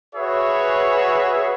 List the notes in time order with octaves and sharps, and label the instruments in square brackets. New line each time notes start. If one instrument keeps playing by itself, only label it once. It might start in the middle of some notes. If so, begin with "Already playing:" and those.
[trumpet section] F#4 G#4 B4 C#5 E5